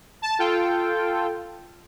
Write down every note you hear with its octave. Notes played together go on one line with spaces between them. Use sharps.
A5
F4 A4 G5